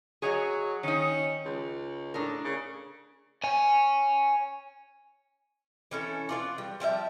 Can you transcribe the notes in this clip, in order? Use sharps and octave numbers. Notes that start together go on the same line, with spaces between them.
F#3 G#4 C#5 D#5
D#3 C#4 D#4
C#2
A2 D4 D#4 A#4
C#3
C#5 G#5
E3 C#4 A4
B3 F4 D5
G3
F3 G3 C#5 E5